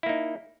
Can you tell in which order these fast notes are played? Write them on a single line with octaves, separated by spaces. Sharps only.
E4 A#3 D#4